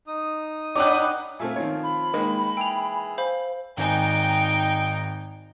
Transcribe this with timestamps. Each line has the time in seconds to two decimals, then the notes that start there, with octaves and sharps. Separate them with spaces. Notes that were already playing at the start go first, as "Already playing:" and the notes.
0.08 D#4 D#6
0.75 A2 D4 B4 C#5 D5 F#5 G5 D6
1.39 A#2 A3 C4 E5 F5 G#5
1.56 D#3 F3 C4 F4 C#5
1.84 B5
2.13 D#3 G#3 A#3 D#4
2.57 E3 G#4 G5 E6 F7
3.18 C5 F5 B5
3.77 G#1 D#4 G5 G#5